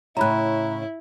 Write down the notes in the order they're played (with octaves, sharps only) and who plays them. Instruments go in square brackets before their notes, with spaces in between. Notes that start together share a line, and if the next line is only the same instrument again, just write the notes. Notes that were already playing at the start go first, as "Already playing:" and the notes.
[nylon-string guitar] A2 C#3 [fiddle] E4 [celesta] A#5 B5 F#6